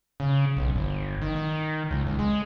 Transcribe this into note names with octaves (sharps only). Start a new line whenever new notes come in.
C#3
B1
G1
D#3
D#3
C#2
C#2
G#3